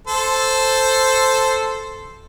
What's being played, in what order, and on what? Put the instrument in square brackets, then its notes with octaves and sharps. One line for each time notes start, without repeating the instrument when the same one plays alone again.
[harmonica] A4 C5